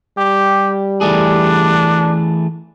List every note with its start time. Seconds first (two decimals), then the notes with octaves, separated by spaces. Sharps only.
0.18 G3 G4
1.01 E3 A3 D4 G#4